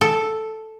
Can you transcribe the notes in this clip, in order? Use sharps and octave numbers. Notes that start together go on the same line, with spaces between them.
A4